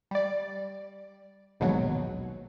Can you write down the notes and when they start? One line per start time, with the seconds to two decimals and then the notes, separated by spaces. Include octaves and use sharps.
0.11 G3 D5
1.60 A#1 D#2 G#2 B2 F#3